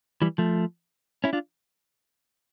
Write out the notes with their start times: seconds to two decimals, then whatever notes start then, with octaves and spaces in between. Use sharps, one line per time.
0.22 E3 G3
0.38 F3 A3
1.24 C#4 E4
1.33 D4 F4